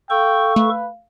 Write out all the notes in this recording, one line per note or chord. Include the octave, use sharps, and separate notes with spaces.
A4 F5 G5 C#6
A3 B4